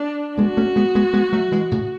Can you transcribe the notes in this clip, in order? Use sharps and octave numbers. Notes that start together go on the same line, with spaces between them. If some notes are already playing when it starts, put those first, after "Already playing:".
Already playing: D4
G#3 B3 F#4
A3 C#4
G#3 B3
G#3 B3
G#3 B3
F#3 A3
E3 G#3
A2 C#3